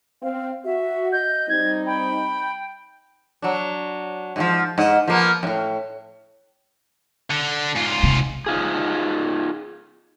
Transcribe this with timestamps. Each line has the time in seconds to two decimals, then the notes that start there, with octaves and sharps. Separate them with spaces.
0.23 C4 F5
0.65 F#4 E5
1.12 D#5 G6
1.49 G3 C4 D#4 G#6
1.86 G5 B5
3.42 F#3 D4
4.36 G#2 C#3 F3
4.78 G#2 D#5
5.08 F3 A#3 B3
5.43 F#2 A2
7.30 D3
7.75 G#2 F4
8.03 C3
8.46 D#4 F4 G#4